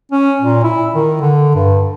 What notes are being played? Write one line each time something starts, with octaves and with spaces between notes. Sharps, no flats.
C#4
A#2
E4
D#3
D3
G2